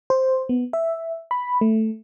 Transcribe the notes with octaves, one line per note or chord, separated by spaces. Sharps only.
C5
B3
E5
B5
A3